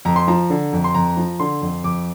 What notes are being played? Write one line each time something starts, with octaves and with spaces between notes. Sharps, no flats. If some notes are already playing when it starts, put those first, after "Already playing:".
F2 A#5
C6
F3 A#5
D3
F2
C6
F2 A#5
F3
D3 C6
F2
F2 D6